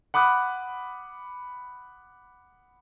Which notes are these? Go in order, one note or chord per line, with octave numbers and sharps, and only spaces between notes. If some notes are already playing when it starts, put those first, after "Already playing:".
F#5 B5 D6 D#6 F#6